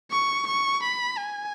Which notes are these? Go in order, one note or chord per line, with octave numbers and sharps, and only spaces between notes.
C#6
C#6
B5
G#5